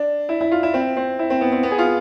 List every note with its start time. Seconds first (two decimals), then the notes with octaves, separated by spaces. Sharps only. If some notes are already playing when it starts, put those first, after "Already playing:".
Already playing: D4
0.29 E4
0.41 E4
0.51 F4
0.63 E4
0.74 C4
0.97 C4
1.19 E4
1.30 C4
1.41 B3
1.52 C4
1.63 B3
1.71 G#4
1.78 F4